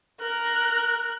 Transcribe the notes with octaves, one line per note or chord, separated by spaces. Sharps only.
A#4 F#6